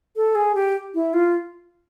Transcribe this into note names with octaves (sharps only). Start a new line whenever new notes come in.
A4
G#4
G4
E4
F4